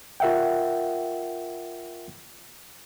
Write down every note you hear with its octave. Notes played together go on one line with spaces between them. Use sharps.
F4 A#4 E5 F#5 G5